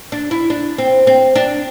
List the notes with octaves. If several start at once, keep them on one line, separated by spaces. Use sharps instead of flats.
D4
E4
D4
C4
C4
D4